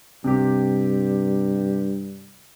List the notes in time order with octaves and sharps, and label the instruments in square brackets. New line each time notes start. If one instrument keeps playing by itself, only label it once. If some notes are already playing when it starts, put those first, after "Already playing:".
[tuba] G2 [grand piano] C3 G4